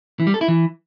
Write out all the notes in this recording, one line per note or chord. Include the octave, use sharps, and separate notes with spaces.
E3
G3
A4
E4
E3